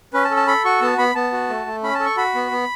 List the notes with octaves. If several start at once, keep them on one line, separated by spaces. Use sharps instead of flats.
C#4 B4
A5
A4
A5
A4 B5
F#4 C#6
B3 A5
B3 B5
B3 A5
F#4
A3
A3
C#4 B5
A5
A4
C#6
F#4 B5
B3
B3